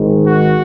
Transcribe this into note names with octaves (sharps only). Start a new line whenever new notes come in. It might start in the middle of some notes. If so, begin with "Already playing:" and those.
Already playing: G#1 G#2 D#3
F#4